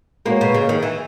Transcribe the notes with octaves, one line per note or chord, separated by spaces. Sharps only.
G#3 A#3 B3 F#4 A#4 C#5
B2
C#3
D#3
E3